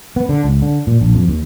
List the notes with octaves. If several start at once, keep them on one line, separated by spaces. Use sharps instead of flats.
B3
D3
C#2
D3
A#2
A#1
F2
D#2